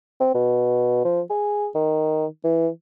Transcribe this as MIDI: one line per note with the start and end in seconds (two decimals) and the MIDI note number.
0.20 0.32 60
0.34 1.01 47
1.05 1.21 53
1.30 1.68 68
1.75 2.26 51
2.44 2.68 52